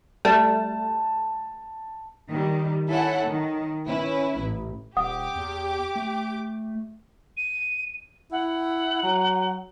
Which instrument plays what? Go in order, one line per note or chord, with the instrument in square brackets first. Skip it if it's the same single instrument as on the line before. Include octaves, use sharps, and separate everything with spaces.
[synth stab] G3 A3 [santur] A5
[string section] D#3 G3
E4 A4 C#5 F#5 G#5
D#3
C#4 E4 B4
A1
[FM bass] D#1 [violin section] G4 D6 [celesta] F#5 D#6
[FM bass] E2
A3
[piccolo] D#7
[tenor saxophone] E4 [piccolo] F#5
[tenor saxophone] F#3